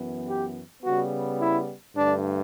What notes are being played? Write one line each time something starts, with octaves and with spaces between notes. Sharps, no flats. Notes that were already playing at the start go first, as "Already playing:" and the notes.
Already playing: F#2 E3 B3
G4
C#3 G3 B3 F#4
E4
G2 D3 A3 D4